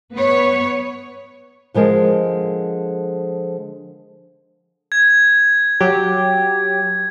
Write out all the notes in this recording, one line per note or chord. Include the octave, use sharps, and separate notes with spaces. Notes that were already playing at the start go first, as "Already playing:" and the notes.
B3 B4 C#5
D3 F3 G#3 A#4
G#6
F#3 G4